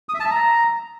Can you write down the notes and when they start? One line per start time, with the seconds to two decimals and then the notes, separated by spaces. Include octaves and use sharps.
0.09 D#6
0.14 E5
0.20 A5
0.25 E5
0.31 A#5